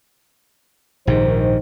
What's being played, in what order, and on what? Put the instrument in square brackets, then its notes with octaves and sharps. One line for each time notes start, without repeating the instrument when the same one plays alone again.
[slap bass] A#1 G#2 C3 [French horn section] D#3 C5